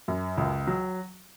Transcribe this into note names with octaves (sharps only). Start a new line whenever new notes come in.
F#2
C#2
F#3